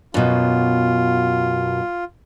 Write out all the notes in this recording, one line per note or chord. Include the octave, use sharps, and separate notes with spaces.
F#2 B2 F4